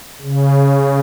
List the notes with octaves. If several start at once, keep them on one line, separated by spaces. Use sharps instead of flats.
C#3